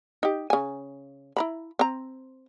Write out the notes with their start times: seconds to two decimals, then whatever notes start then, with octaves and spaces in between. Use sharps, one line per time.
0.23 D#4 G4
0.50 C#3 G#5
1.37 E4 A#5 B5
1.79 C4 A#5